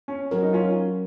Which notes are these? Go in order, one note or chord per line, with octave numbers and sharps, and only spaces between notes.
C#4
F#3 C#4 F#4 A#4
D#4
C#4 F4